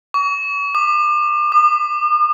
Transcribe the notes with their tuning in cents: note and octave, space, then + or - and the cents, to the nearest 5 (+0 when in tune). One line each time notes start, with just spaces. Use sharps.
C#6 +40
D6 +40
D#6 -45